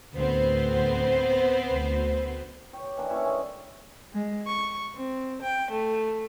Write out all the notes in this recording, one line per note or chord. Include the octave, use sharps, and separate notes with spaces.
D2 A2 B3 C4 C5
D2
C#5 G5
G4
E3 A#3 D4
C#4 E4 A4 C#5
G#3
G#3
C#6
C4
G5
A3